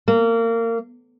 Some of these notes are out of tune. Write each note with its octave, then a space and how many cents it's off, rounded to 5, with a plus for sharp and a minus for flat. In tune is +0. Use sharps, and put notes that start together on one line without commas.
A#3 -25